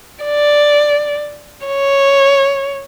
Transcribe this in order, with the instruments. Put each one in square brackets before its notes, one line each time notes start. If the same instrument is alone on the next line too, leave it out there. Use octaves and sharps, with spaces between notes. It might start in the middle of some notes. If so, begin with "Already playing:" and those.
[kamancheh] D5
C#5